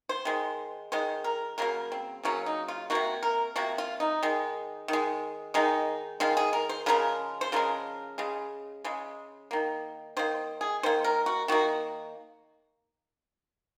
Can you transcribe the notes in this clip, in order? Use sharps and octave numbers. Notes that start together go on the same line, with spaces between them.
C5
D#3 G#3
D#3 G#3 C5
A#4
C#3 F#3 A#3 A#4
C4
C#3 F#3 A#3 C#4
D#4
F4
F3 A#3 F#4
C3
A#4
C3 F3 A#3 F#4
F4
D#4
D#3 G#3
D#3 G#3
D#3 G#3 D#4
D#3 G#3 F4
G#4
A#4
C5
C#3 F3 G#3 A#4
C5
C#3 F3 G#3 A#4
C#3 G#3
C#3 G#3
D#3 A#3
D#3 A#3 C5
G#4
D#3 A#3 C5
A#4
F#4
D#3 A#3 F#4